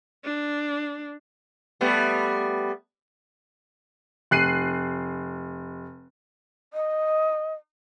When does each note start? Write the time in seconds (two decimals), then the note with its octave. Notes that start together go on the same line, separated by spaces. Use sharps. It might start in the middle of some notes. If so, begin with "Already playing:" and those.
0.24 D4
1.81 G3 A3 B3
4.31 F1 F#6 C7 D#7
6.73 D#5